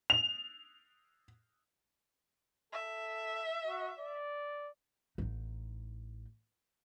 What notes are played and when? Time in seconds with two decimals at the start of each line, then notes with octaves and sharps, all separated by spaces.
0.10 F7
2.73 A4 E5
3.67 F#4
3.99 D5
5.18 A1 D#4